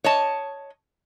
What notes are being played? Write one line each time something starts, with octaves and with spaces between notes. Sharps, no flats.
C#5 D#5 A5